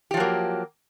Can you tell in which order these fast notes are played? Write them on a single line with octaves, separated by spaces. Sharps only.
G4 F3 F#3 A#3